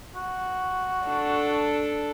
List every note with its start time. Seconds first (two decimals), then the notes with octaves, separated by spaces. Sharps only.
0.15 F#4
1.05 D4 A4